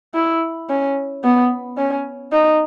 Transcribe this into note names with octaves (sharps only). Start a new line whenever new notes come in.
E4
C#4
B3
C#4
D#4